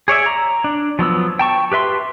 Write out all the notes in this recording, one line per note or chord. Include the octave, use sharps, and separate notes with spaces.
G#4 C#5 D5 E5
A#5
D4
F3 F#3 B3 E6
G5 A5 C#6
G4 B4 E5 C6